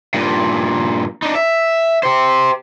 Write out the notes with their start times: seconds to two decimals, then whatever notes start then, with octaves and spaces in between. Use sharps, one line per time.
0.14 G2 A#2
1.22 D4 D#4
1.35 E5
2.03 G4 C5